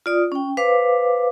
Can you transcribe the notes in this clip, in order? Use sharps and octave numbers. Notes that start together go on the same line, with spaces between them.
F4 D5 D#6
C#4 G5
B4 C5 F5 D6